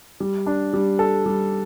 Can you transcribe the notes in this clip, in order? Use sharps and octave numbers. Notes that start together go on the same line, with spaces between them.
G3
D4
G3
A4
G3